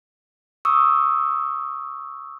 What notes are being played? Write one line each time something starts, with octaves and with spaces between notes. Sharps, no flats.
C#6 D#6 E6